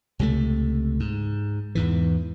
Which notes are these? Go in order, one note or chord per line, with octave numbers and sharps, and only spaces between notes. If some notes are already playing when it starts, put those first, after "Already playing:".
C#2 C3 D#3 A3
G#2
E2 G#2 E3